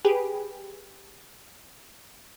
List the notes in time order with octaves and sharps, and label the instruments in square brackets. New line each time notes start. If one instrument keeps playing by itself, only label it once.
[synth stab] G4 G#4 B4